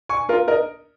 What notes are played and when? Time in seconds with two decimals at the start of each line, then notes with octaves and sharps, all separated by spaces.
0.09 G#5 C#6
0.29 F4 A#4
0.48 A#4 D#5